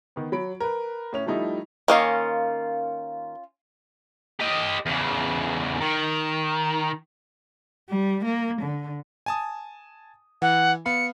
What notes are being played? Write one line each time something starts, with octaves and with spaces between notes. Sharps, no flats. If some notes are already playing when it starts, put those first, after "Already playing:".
D#3 B3
F#3 B5 D7
A#4 B4
A2 C#4 F7
F3 G3 A3 D#4 E4
D#3 A#3 C#4 F4 D#5
G4 D#5
E2 C#3
D#3
G3
A#3
D3
G#5 A5 D#6
E3 F#5
B3 F5 B5 C#7